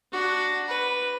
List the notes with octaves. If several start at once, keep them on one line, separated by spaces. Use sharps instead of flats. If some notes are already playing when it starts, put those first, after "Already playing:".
D4 F#4
B4